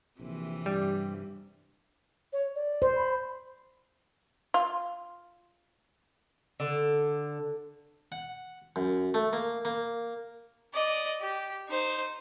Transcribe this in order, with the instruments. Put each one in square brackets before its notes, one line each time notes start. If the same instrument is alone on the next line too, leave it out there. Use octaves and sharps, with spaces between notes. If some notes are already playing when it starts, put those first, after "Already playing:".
[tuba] A#1 [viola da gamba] C3 E3 C4
[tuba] G2 [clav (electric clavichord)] G3
[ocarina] C#5
D5
[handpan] C5
[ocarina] B5
[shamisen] F4
[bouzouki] D3
[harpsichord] F#5
F#2
A3
A#3
A#3
[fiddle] D5 D#5
G4
D#4 C5